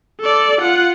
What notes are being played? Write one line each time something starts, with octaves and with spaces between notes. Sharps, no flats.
A4 D5
F4 F#5